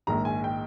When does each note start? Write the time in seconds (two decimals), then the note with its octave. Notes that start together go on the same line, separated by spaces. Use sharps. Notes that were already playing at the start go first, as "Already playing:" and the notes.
0.07 A#1 G#2 D#3 A#5
0.25 G#5
0.44 G5